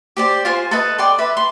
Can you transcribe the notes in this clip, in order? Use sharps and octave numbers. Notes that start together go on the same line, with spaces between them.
G4 C5 D5
F4 C5 G#5
A4 B4 D#5
D5 G5 C6
B4 D5 E5
C6